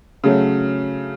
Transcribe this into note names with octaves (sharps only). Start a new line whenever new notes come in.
C#3 F#3 A3